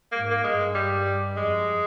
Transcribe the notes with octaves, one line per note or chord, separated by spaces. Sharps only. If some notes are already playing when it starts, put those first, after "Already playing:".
G#2 A#3
A#3
G2 G#3
G3
F2 G#3